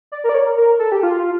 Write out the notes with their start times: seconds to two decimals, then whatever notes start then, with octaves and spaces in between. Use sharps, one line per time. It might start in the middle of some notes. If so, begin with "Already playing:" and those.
0.12 D5
0.24 A#4
0.29 D5
0.34 C#5
0.46 A#4
0.57 A#4
0.79 A4
0.92 G4
1.03 F4